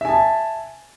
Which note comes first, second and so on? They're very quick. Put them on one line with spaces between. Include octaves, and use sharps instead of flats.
E5 G#5 A5